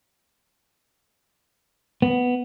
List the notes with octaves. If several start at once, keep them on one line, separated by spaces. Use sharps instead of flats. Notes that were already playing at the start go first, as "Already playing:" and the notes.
B3